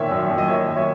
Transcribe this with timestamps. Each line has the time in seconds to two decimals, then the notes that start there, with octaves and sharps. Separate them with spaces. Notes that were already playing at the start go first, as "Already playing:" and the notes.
Already playing: A#2 D#3 C#5 E5
0.11 F#2
0.30 F#2
0.38 D#5
0.48 D#3 C#5 E5
0.68 F#2
0.76 C#5 E5